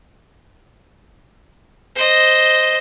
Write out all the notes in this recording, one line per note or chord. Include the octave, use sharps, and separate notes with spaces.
C5 D#5